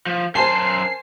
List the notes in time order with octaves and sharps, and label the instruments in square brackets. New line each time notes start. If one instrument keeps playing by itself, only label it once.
[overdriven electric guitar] F3
[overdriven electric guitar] F#2 C6 [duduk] A#4 [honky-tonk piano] C5 G#5 A5 [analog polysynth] C7